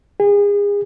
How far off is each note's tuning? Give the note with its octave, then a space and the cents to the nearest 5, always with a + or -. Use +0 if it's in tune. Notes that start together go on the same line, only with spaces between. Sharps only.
G#4 -35